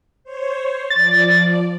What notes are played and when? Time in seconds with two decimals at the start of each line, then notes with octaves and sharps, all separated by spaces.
0.24 C5 C#5
0.90 F3 D5 A6